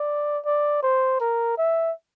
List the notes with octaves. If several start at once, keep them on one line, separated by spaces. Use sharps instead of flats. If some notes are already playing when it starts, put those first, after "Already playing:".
Already playing: D5
D5
C5
A#4
E5